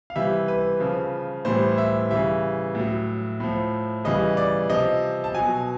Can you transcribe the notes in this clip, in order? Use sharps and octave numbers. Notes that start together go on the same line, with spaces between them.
F5
C3 E3 G3 E5
B4
C#3 F3
A2 E3 G3 C5
E5
C#3 E3 G3 E5
A2 F#3
A2 F3
C#3 E3 G3 D#5
D5
C3 F3 D#5
A5
B2 F#3 G#5